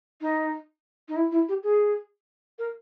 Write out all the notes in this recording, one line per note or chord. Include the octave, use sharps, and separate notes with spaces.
D#4
D#4
E4
E4
G4
G#4
A#4